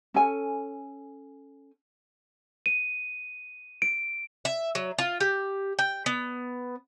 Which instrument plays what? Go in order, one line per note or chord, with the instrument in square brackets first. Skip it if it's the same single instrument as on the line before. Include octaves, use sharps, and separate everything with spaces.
[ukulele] C#4 A4 G#5
[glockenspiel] D#7
D7
[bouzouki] E5
F#3
F4
G4
G5
B3